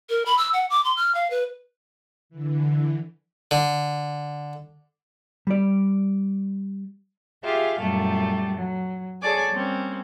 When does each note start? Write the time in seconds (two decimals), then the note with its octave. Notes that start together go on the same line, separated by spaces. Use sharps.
0.10 A#4
0.26 B5
0.38 E6
0.53 F#5
0.70 D6
0.84 C6
0.97 F6
1.15 F5
1.31 B4
2.29 D3 E3
3.51 D3
5.47 G3 D5
7.43 F4 G4 G#4 E5 F5
7.79 F#2 A#2 G3 A3
8.56 F#3
9.21 G#4 A4 C#5 D5 G#5 D6
9.51 G3 A#3 C4 C#4